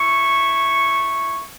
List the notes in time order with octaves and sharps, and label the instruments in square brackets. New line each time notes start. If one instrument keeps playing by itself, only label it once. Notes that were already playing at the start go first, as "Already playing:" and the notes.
Already playing: [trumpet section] A3 E4 C#6